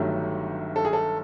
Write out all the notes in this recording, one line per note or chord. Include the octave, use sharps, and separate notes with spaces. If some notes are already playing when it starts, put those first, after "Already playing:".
Already playing: G1 G2 D#3 F#3 A3
A4
G#4
A4